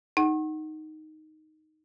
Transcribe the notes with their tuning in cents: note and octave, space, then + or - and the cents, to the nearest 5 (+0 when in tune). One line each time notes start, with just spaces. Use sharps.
D#4 +0 F#5 +15